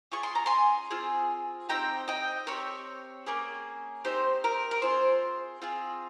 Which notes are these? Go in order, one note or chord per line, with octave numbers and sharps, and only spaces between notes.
C#4 F4 G#4 C#6
C6
A#5
G#5 C6
C4 F4 G#4
C4 D#4 G4 G5 A#5
D#5 G5
C4 G4 A#4 C#5
A#3 C#4 G#4
C4 D#4 G4 C5
A#4
A#4
C4 F4 G#4 C5
C4 F4 G#4